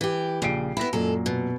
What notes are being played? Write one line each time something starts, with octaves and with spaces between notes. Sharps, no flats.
E3 G4
A#1 C#3 C7 D7
B3 E4 B5 A#6
F#2 A#2 G#3 A4
B2